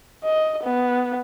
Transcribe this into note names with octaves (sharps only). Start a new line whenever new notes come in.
D#5
B3